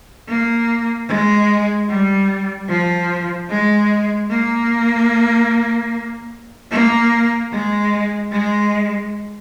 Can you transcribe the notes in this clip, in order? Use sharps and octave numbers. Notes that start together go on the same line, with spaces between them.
A#3
G#3
G3
F3
G#3
A#3
A#3
G#3
G#3